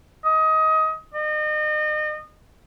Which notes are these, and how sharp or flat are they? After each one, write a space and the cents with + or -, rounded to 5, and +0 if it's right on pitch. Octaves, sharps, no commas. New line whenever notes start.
D#5 +25
D#5 -35